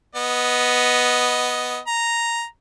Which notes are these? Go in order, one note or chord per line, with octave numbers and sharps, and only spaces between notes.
B3 D#5
A#5